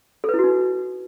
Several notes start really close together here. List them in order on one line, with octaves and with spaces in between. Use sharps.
A4 B4 E4 F#4 D#4